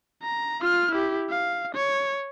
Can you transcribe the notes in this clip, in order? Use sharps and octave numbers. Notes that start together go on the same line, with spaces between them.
A#5
F4 F6
E4 G4
F5
C#5